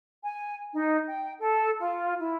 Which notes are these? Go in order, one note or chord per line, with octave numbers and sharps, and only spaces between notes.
G#5
D#4
G5
A4
F4
E4